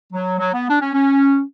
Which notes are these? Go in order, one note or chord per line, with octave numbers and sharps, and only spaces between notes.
F#3
F#3
B3
D4
C#4
C#4